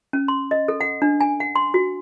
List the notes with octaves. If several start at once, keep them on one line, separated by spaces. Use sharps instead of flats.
C#4
C6
D#5
A4
F#5
D4
G#5
F#5
C6
F#4